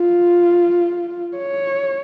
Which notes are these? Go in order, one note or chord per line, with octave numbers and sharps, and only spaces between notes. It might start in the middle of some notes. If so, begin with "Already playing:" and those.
Already playing: F4
C#5